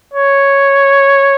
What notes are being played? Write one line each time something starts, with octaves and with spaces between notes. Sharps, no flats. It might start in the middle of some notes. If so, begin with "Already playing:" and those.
C#5